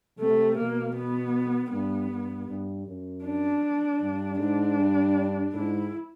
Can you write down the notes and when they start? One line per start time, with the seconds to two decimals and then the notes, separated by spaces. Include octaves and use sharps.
0.19 C3 A3
0.57 B2 A#3
0.95 B3
1.71 G2 B3
2.10 G2
2.48 G2
2.87 F#2
3.24 D4
4.01 G2
4.39 G#2 D4
4.77 G2
5.54 G#2 E4